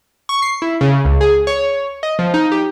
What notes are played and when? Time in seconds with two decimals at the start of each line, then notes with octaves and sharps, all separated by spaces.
0.29 C#6
0.42 C7
0.62 E4
0.81 C#3
1.05 C#2
1.21 G#4
1.47 C#5
2.03 D#5
2.19 F3
2.34 D#4
2.52 G4